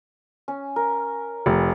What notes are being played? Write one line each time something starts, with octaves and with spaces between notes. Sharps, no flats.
C#4
A#4
F1